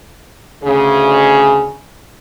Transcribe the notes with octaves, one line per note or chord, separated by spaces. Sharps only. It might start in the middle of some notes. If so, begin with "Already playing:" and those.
D2 C#3 G#4